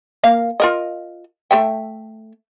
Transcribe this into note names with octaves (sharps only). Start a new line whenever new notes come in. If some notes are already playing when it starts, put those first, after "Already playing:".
A#3 A#4 F5
F4 A#4 D#5
A3 E5 G5